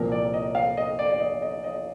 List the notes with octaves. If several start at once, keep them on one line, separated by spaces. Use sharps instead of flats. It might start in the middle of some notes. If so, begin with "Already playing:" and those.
Already playing: C2 A#2 F3 A#4
D5
D#5
F5
D#5
D5
D5
D#5
D#5
D#5